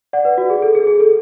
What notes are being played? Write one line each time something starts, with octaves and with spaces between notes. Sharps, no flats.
D5 F#5
B4
F#4
G#4
A4
G#4
G#4
A4